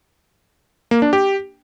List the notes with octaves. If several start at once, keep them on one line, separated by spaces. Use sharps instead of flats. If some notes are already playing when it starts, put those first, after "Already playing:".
A#3
D4
G4